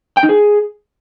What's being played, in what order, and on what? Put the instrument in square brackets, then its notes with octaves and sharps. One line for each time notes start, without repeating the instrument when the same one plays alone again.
[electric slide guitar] G5
D#4
G#4